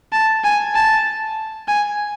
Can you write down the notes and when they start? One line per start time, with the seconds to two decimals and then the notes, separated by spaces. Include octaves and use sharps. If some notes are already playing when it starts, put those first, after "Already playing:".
0.12 A5
0.44 G#5
0.75 A5
1.68 G#5